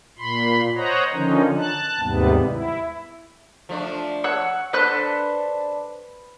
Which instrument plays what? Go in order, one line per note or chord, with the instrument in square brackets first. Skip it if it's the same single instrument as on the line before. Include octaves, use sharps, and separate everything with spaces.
[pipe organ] A#2 B5 C6
C5 C#5 D#5 F#5 A#5
D3 D#3 F3 C#4 D#4
A5 F#6
D#2 G#2 C3 G3 B3
E4
[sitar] F3 A3 D4
[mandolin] C#5 F#5 E6
[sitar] D4 A4 C5 [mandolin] B4 F#6